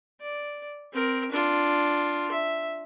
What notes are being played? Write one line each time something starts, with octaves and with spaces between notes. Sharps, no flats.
D5
C4 A#4
D4 F4
E5